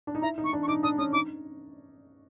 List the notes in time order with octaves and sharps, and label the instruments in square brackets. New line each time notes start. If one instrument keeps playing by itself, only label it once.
[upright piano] D4
D#4
[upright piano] E4 [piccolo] A#5
[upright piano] D#4
[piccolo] C#6
[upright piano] D4
[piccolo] C#6
[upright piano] D#4 [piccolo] D6
[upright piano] D4 [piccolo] D#6
[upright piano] C#4 [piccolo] D#6
[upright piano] D#4 [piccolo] D6